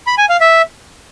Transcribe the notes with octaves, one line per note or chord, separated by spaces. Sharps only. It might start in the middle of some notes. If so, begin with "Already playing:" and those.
B5
G#5
F5
E5